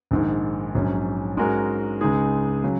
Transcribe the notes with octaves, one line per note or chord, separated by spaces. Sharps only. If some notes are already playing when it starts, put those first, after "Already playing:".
A#1 G#2 D#3
A#1 G#2 F#3 C#4
G#2 G#3 C#4 F#4 A#4
C#2 C#3 G#3 D#4 G#4
C#3 F#3